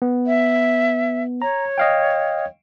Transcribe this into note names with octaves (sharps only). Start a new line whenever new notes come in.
B3
E5
C#5 A#5
D#5 F5 G5